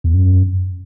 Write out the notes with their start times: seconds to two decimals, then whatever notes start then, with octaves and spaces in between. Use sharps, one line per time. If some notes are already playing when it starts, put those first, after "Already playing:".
0.04 E2
0.14 F#2